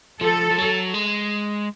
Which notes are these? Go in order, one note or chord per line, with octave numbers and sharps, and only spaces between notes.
F3 A4
F3
F#3
G#3